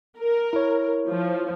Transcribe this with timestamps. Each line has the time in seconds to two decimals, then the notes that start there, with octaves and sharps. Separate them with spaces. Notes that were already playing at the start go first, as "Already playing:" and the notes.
0.18 A#4
0.53 E4 C#5
1.08 F3